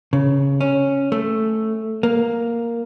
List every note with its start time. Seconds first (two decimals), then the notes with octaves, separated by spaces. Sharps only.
0.13 C#3
0.61 C#4
1.12 A3
2.03 A#3